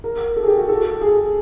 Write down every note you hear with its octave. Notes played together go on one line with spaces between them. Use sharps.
A#4
A4
G#4
G4
F#4
A4
G#4